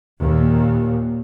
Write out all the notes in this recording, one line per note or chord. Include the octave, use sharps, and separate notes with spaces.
D#2 A#2